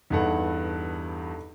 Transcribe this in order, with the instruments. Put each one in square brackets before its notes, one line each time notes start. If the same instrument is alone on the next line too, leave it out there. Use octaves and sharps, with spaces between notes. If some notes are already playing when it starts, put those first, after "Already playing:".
[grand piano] E2 G2 F#5 [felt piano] D#4 A4